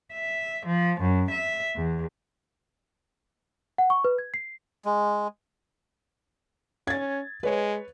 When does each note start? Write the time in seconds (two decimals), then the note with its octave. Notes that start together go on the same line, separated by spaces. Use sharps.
0.13 E5
0.66 F3
1.01 F#2
1.31 E5
1.76 E2
3.78 F#5
3.90 C#6
4.04 B4
4.19 G#6
4.34 C7
4.85 G#3
6.87 C#4 G#6 A6
7.43 G#3 B4 C#5